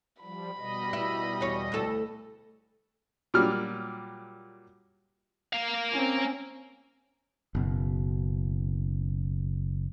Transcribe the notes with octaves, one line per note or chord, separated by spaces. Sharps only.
F3 G3 B5
B2 G3 D#5
E4
E2 C#5
D2 A4
A#2 F#3 G3 F6
A#3 F5
C4 C#4
F#1 B2